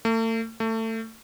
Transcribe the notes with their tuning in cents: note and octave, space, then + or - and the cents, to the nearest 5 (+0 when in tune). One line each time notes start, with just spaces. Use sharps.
A3 +40
A3 +25